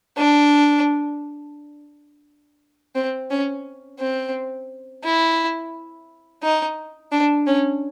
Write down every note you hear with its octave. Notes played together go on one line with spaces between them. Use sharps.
D4
C4
C#4
C4
E4
D#4
D4
C#4